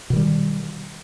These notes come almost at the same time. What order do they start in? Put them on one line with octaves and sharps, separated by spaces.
B2 D#3 G3